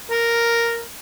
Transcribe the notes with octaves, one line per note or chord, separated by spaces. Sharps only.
A#4